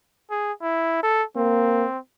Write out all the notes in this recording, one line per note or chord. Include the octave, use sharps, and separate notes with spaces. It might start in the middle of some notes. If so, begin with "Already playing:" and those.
G#4
E4
A4
A#3 C4